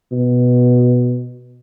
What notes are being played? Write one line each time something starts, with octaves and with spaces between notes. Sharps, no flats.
B2